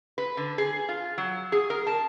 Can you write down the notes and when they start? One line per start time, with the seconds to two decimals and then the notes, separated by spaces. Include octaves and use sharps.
0.18 B4
0.37 D3
0.58 G#4
0.89 F4
1.18 F#3
1.52 G#4
1.70 A#4
1.87 A5